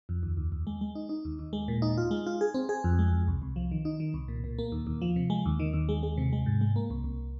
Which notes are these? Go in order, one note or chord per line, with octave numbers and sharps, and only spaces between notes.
F2
D#2
D#2
D#2
G#3
G#3
D#4
D#4
D#2
D#2
G#3
A#2
D#4
F4
G#3
F4
G#4
C4
G#4
F2
G#3
F2
C2
C2
F3
D#3
D#4
D#3
C2
A#2
A#2
A#3
D#2
D#2
F3
C3
G#3
D#2
D#3
D#2
G#3
G#3
C3
G#3
G#2
G#3
A#3
C2
C2